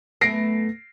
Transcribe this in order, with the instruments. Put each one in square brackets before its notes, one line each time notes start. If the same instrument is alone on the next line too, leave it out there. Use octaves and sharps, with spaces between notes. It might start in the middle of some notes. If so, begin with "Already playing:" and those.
[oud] F#2 A3 B3 [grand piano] A#6 C7 D7